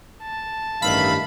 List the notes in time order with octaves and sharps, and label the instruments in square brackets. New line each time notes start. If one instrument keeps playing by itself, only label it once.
[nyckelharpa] A5
[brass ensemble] A1 G2 D#3 [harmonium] E5 F5 [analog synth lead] B5